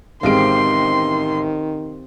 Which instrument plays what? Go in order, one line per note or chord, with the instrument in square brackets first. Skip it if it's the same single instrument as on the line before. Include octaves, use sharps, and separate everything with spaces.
[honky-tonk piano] A1 G#3 D7 [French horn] D#3 [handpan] C4 G4 F5 [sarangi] C6